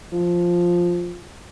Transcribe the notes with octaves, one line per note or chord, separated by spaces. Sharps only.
F3